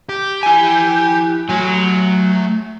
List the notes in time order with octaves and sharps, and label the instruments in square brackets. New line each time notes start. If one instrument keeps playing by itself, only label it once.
[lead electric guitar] G4
[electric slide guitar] E4 G#5
[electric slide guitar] F#3 [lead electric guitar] A3 G#5